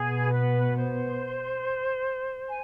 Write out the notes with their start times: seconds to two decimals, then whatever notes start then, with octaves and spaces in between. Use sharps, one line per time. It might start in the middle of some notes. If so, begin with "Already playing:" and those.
Already playing: B2 B3 G#4
0.31 B4
0.75 C5
2.49 G#5